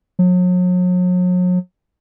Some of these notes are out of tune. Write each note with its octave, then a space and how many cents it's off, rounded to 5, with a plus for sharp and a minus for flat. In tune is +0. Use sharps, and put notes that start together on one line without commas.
F#3 -40